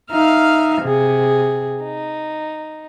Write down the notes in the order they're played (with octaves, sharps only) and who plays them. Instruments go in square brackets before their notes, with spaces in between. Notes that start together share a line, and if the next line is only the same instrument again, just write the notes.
[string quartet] D#4 E5 F5 F6
C3 G#4
D#4